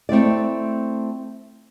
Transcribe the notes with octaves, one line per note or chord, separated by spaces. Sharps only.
A3 C4 E4 D5